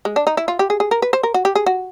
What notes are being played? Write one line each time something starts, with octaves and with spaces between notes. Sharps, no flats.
G#3
D4
D#4
E4
F4
G4
G#4
G#4
A#4
B4
C5
A#4
F#4
G4
G#4
F#4